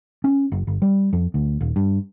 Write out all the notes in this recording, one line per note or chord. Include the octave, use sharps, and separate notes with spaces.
C#4
F#1
G1
G3
F2
D2
D#1
G2